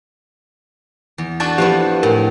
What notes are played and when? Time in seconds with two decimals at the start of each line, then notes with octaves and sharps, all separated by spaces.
1.18 E2
1.40 D4 F#4 A4 A5 A6
1.58 F3 B3 E4 G4
2.03 A2 A#4